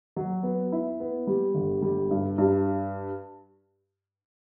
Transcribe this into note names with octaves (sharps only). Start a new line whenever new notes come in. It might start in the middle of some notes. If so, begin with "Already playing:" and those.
F#3
B3
E4
B3
G3
G1
G3
G2
G2